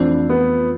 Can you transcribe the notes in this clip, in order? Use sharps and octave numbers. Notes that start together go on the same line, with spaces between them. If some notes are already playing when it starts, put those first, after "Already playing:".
Already playing: F2 E3 A3 C4 D4 F4
B3